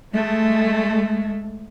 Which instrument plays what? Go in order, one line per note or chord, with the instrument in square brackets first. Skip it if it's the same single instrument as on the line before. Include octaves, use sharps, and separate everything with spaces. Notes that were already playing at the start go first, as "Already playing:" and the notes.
[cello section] G#3 A3